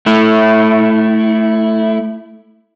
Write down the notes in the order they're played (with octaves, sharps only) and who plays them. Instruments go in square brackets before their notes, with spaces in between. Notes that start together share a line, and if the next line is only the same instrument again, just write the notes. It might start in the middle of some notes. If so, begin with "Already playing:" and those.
[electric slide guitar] A3 E4